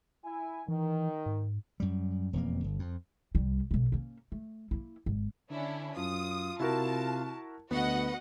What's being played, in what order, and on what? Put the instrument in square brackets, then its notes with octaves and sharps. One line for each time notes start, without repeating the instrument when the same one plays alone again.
[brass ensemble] E4 G#5
[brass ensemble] D#3 [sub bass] E3
[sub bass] G#2
[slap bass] F#2 G3
E1 F2 A#3
G1
F2
[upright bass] C2 G3
B1 C#3
A#3 C#4
A3
A#3 E4
G#1
[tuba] D3 [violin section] C#4 D4 E4
[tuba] F#2 [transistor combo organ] F4 [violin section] D#6
[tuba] C3 [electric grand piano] E4 F#4 A#4 [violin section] A5
[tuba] D2 [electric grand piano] B3 [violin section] F#4 D#5 F#5 [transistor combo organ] B4